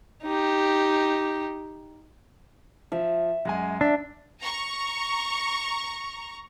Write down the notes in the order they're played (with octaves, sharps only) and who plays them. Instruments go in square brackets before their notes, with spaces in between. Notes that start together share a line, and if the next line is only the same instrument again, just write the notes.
[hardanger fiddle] D#4 G4
[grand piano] F3 [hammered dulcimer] E5
[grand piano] F#2 G#3 G#5 [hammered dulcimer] F#5
[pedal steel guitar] D4 [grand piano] E5
[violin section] A#5 C#6